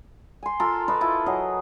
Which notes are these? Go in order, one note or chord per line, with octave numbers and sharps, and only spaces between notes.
G#5 C6
F4 A4 A#4
F4 B4 D#5
E4 F4 A4
F#3 G#4 D#5